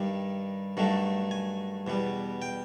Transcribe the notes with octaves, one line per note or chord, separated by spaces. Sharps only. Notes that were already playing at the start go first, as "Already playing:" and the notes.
Already playing: G2 D#3 G3
G2 D#3 F#3 A3
G#5
E2 B2 G3
G5